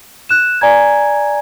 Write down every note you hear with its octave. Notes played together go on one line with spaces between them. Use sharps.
F#6 E7
D5 G#5 A#5 G#6